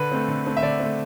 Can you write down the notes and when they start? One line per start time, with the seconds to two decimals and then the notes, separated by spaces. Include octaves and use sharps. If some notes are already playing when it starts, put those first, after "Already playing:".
Already playing: D3 B4
0.12 A3 C4
0.28 D3
0.46 A3 C4
0.57 E5
0.63 D3 D5
0.80 A3 C4